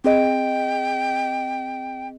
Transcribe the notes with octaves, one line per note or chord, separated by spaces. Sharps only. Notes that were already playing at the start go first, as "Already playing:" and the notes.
C4 G#4 D#5 G5